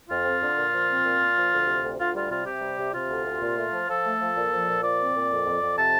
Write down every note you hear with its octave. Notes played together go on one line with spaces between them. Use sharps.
F2 F4
C4
D3
A#2
F3
C4
A#2
A#2
F3
D2
C3
D2
D2 F4
G3 F4
C3 F4
C3 G4
G3
C3
C3 F4
D2
C3
A#2
A3
F3
F3 A4
A3
F3
A#2
F3
A#2
F3 D5
C4
A#2
F2
F2
F2
C3 A5